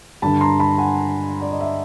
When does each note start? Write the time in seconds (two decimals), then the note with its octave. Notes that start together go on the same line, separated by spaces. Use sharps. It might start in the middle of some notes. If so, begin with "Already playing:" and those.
0.22 G2 D3 G3 A5 B5
0.41 A#5 C6
0.60 A5 B5
0.78 F#5 G#5
1.41 D5
1.51 D#5
1.61 E5